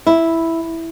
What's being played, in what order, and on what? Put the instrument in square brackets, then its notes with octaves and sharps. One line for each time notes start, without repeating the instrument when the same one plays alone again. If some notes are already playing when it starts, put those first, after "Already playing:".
[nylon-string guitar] E4